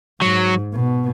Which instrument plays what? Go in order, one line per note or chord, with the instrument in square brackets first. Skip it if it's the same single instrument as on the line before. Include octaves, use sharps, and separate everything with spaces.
[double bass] G#2 [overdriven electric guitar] F#3
[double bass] B2